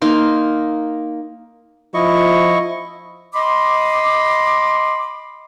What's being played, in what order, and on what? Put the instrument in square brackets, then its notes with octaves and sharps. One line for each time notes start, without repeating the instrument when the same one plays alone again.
[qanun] A#3 D#4 A#4 C6
[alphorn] F3 [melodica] E4 D#5 C#6
[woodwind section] D#5 B5 C6 D6